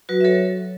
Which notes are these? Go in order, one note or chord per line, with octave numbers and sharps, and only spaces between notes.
F#3 F#4 B4
E5
F#3 A4 C#5